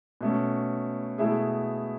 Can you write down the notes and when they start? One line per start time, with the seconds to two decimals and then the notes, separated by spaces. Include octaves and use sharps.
0.21 B2 A3 C#4
1.18 B2 A3 E4 G#4